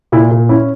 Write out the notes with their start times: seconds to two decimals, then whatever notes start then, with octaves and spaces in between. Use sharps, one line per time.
0.12 A#2 E4
0.31 A#2
0.49 C#4 E4